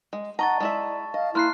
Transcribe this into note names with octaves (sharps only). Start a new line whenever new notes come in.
G#3
D#4 F#5 A5 A#5 C#6 A6
G#3 E4 D5 E5
D#5 F5
A#3 E4 C6 F6 F#6 C7